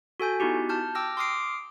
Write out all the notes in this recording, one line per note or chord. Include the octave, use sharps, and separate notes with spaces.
F#4 A4 G#5 G6
B3 D#4 E4 F#4 G4
A5 F6 G6
G5 D6 E6 F6 A#6
C6 D6 D#6 F6 C7 D7